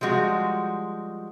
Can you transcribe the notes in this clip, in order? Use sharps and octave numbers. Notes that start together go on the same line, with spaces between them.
F3 G3 G#3 F#4